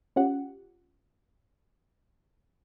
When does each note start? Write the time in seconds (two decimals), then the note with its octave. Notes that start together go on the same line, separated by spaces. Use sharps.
0.16 C#4 F4 G4 F#5